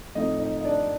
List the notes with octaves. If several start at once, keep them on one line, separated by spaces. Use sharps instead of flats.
A2 F3 A3 C4 D#4 D#5
D#4 D#5
D#5
D4 D5